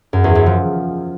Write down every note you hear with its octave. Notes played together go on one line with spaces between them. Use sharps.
F#2
E2
F#2
F3